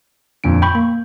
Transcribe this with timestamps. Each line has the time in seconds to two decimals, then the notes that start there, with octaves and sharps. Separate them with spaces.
0.44 F2 A#2 D3 D7
0.62 G5 B5 C#6 G6
0.75 A#3